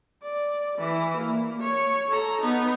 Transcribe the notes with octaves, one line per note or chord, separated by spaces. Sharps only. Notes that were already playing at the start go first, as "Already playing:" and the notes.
D5
E3
A#3
C#5
A4 A#5
B3 D#4